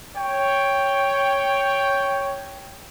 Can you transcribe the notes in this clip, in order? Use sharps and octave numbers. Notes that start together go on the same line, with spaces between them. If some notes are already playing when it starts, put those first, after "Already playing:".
C#5 G5